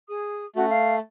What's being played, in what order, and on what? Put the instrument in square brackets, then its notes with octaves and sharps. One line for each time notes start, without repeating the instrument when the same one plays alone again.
[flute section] G#4 D#6
[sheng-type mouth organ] A3 [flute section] C#4 F#4
[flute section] F5